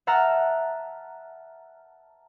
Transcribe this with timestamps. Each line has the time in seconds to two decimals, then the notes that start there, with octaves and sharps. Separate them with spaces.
0.07 E5 F#5 A5 A#5 F6